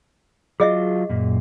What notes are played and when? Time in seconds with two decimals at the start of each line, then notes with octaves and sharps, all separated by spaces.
0.60 F#3 F4 G#4 D#5 E5
1.09 F#2 A#2